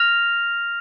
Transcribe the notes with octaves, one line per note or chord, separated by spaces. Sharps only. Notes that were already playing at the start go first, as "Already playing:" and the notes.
Already playing: F6 A#6 F7